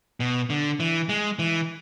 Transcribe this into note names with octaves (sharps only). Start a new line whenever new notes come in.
B2
D3
E3
G#3
E3